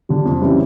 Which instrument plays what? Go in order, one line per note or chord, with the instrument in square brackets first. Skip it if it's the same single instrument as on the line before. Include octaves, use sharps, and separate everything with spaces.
[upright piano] D3 G3
F2
C#3 E3 G3